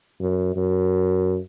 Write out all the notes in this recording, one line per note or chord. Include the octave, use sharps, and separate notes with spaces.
F#2
F#2